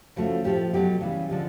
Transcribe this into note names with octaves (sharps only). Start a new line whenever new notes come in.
C#3 F3 A3 F#4
A2 F3 A3 G4
B2 F#3 A3 G4
C#3 E3 G3
D3 F3 G#3